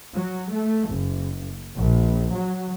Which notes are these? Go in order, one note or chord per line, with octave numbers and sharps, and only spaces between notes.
F#3
A3
F#1
A#1
F#3